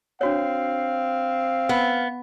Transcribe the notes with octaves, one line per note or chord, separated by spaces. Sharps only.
C4 D4 F#4 C#5 F5
B3